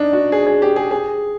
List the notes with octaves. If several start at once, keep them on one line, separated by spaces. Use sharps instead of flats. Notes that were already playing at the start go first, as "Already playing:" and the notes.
Already playing: D4 D#4
F#4
G#4
G#4
G4
G#4
G#4